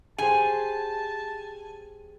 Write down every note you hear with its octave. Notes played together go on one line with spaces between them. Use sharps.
G4 G#4 C5 G#5 A5